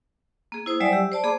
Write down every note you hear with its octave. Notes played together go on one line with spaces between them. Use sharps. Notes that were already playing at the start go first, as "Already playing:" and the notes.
A#3 G#4
E4 C5 D#6
F#3 G3 D5 E5 G#5
G4 E6
C5 D5 A5
A#3 G#4 B5 D6